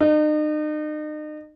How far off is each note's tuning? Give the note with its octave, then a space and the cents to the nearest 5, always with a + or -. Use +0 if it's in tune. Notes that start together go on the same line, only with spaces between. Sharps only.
D#4 -40